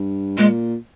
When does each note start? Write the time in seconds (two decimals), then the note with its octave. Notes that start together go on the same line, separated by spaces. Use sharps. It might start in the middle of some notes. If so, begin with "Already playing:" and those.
Already playing: G2
0.38 A#2 G#3